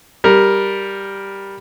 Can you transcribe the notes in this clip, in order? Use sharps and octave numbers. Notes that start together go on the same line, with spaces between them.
G3 A#4